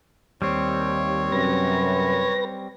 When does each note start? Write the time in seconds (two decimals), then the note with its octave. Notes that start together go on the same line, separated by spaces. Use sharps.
0.42 D#2 G3 C4 C#5
1.32 F#2 C3 B4 A#6